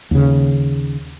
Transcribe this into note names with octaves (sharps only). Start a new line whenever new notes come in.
D#2 C#3